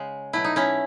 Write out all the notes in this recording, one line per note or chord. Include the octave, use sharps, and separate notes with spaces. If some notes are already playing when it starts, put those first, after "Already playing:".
Already playing: C#3 G#3
B2 F#3 A3 E4
D#4
C#4 E4